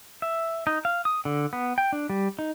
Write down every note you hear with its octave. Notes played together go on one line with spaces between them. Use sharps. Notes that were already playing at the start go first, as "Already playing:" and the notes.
E5
D#4
F5
D#6
D3
B3
G5
D4
G3
D#4